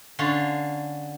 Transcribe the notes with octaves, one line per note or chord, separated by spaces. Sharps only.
D3 C#4 F4 A5